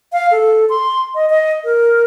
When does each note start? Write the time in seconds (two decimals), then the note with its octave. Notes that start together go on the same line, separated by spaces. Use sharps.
0.12 F5
0.31 A4
0.69 C6
1.15 D#5
1.30 D#5
1.64 A#4